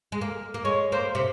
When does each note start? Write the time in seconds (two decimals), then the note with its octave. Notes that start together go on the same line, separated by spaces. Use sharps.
0.12 G#3
0.21 A#3
0.54 A#3
0.64 G#3 C#5
0.92 A#3 C5
1.15 C3